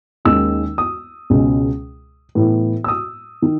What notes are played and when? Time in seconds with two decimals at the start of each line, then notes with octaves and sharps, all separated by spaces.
0.25 D#2 D#3 G#3 C#4 E6
0.78 D#6
1.30 C#2 B2 G#3 C#4
2.35 A2 E3 B3
2.84 E6
2.88 D#6
3.42 D#3